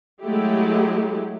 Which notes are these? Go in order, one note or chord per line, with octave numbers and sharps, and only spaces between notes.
F#3 G#3 A3 E4 G4